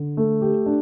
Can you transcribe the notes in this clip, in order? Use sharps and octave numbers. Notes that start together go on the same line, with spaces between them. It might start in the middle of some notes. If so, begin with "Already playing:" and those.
Already playing: D3
A3
G4
D4